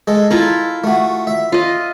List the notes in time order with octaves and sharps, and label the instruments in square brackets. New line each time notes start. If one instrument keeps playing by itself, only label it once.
[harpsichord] G#3 A4
[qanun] E4 F4 [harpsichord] A4 A#5
[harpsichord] A3 F#4
E5
[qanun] F4 D#5